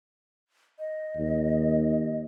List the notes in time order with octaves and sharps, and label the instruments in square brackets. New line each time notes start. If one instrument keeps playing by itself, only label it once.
[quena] D#5
[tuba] D#2